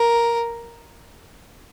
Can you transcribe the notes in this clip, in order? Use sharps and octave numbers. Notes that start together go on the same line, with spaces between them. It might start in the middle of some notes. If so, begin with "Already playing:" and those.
Already playing: A#4